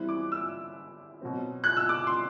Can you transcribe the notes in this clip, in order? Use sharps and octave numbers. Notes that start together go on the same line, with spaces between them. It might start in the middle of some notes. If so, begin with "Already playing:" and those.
Already playing: E3 G3 C4 E4 F#6
D6
E6
B2 F#3 C4
F#6
E6
D6
C6